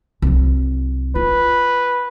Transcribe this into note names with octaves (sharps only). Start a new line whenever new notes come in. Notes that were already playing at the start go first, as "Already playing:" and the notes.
C2 F#3
F4 B4